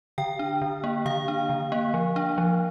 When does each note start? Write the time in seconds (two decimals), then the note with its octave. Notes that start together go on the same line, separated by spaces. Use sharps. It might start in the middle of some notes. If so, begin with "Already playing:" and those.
0.18 D3 G5
0.39 D4
0.62 D3
0.84 A#3
1.06 D3 F5
1.28 D4
1.49 D3
1.72 A#3
1.94 F3
2.16 D4
2.38 F3